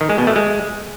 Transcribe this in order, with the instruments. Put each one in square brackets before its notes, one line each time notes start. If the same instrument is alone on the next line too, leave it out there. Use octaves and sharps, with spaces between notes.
[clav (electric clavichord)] D#3
G#3
B2
A3
G#3